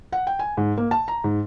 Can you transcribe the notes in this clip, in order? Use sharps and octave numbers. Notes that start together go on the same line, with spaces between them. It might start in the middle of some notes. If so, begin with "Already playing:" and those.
F#5
G5
G#5
G#2
A#3
A5
A#5
G#2